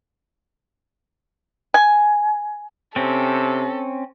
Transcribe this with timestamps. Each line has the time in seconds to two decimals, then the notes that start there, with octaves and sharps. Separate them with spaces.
1.74 G#5
2.96 C3 C4 C#4 A4